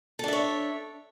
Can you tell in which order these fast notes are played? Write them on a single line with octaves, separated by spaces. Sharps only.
A4 D4 E5 C#5